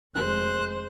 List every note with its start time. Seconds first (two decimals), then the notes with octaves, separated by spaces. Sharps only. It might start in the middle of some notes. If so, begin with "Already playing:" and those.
0.15 F1 G#3 C5 F#6